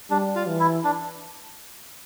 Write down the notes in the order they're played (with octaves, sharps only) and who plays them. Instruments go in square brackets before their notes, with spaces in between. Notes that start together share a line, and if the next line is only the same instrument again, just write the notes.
[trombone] G3 [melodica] D4
[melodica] F4
[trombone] E3
[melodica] E4
D4